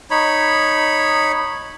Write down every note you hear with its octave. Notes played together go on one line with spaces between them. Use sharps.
D#4 C#5 B5